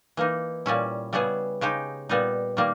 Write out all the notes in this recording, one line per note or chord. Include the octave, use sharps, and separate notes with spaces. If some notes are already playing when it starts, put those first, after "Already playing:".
E3 A#3 D#4
A#2 G3 C#4 E4
C#3 G3 B3 E4 G#4
C#3 G#3 D#4 G4
A#2 G3 B3 D#4
D#3 G3 A#3